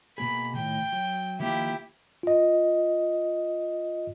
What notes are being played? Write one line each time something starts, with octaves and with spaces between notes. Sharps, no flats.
B2 A#3 G#4 B5
A2 D#3 G5
F#3
D#3 F3 A#3 E4 G4
F4 D#5